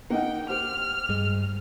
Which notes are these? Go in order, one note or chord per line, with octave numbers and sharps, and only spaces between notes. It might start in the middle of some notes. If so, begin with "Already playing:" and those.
A#3 D#4 F#5 G5
G4 C5 F6
G2 G#3